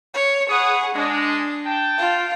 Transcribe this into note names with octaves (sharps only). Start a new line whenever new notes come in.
C#5
G#4 B4 C#5 F#5 D#6
G#3 D4
G5 A5
F4